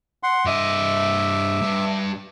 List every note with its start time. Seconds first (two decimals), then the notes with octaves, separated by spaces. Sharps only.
0.23 F#5 C6
0.47 G2 D#5 E5 D6
1.61 G2